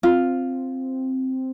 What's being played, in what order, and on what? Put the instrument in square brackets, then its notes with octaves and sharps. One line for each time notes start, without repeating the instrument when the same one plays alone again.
[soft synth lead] C4 [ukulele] F4